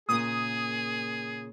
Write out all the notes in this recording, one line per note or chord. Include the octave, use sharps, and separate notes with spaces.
A#2 C#3 A#3 G#4 D#6